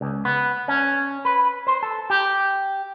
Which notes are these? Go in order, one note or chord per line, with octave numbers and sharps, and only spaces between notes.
C#2
B3
C#4
B4
C5
A4
G4